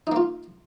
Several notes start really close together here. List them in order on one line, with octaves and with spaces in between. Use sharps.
D#4 A#3 F4